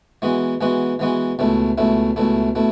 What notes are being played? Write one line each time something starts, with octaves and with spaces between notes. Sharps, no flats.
E3 G#3 B3 F#4
E3 G#3 B3 F#4
E3 G#3 B3 F#4
C#2 B2 A3 E4
C#2 B2 A3 E4
C#2 B2 A3 E4
B2 A3 E4